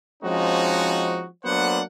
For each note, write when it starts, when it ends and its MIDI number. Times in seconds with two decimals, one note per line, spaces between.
0.24 1.26 53
0.24 1.26 56
0.24 1.26 60
0.24 1.26 61
0.24 1.26 63
0.24 1.26 66
1.45 1.81 54
1.45 1.81 58
1.45 1.81 59
1.45 1.81 62
1.45 1.81 72
1.45 1.81 78